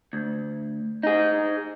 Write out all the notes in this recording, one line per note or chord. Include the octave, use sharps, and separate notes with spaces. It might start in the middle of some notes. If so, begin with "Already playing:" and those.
D2
D#4 G#4